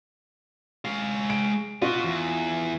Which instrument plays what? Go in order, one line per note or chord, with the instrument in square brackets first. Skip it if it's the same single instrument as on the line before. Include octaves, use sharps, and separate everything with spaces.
[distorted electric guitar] G#3 F5
[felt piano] D7
[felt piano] F4 [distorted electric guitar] F#4 D#5
[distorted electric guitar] E2